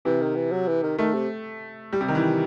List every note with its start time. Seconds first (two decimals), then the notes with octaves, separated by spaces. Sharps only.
0.05 C3 E3
0.21 D#3
0.36 E3
0.52 F#3
0.68 E3
0.83 D#3
0.98 D#3 A3
1.14 C3
1.93 G3
2.01 C3
2.08 D#3
2.15 E3